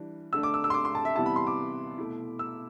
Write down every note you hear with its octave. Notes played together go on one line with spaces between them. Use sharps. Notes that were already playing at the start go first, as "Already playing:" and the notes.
Already playing: E3 G3 D4
D3 A3 D4 E6
D6
E6
E6
C6
D6
C6
A5
E5
C3 E3 G3 B3 E4 A5
B5
C6
D6
B2 A3 E4
E6